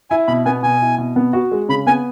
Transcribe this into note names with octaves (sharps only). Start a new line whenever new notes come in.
E4 G#5
B2 B5
B3 G#5
B2 G#5
E4
B2
B3
F#4
G#3
C#3 B5
B3 G#5